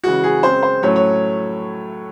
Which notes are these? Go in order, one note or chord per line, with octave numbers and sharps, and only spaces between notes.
C#3 E3 G#3 F#4
G#4
C#3 G#3 C4 C5
C5
A2 F#3 A3 C#4 C#5
C#5